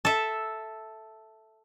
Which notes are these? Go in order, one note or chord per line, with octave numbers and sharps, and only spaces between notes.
A4 E5